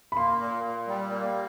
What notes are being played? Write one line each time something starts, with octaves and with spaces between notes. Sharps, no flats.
B5
A#3 C6
A#2
A#2
G3
A#3